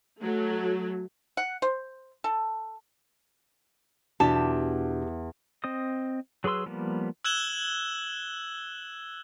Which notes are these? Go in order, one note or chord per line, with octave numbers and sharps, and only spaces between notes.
F#3 A3
F#5
C5
A4
E2 B2 D4 F#4 G4 A5
C4 C5 D#5 D#6
F#3 G#4 B4 C6 E6
F3 G3 A#3 B3
E6 F#6 G#6 E7 F#7 G7